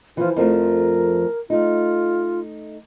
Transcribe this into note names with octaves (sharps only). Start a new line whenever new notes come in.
E3 F3 F4
F2 F3 A3 A#4
A3 D#4 F4